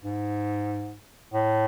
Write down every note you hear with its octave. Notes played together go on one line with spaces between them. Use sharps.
G#2
A2